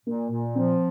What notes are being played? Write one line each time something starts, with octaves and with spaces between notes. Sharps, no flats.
A#2 A#3
A#2
F3 C4